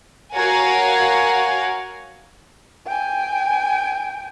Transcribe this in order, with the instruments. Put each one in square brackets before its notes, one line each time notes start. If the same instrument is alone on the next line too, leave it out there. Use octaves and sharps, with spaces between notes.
[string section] F#4 A#4 C#5 F5 F#5 G#5
[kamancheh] G5 G#5